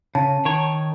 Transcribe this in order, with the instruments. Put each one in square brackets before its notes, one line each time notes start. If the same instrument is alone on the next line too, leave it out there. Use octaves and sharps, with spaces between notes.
[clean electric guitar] C#3 [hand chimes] A5
[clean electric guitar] D#3 C#5